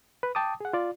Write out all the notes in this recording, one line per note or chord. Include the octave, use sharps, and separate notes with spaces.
B4
G5 A5 D6 D#6
G#4 F#5
F4 D5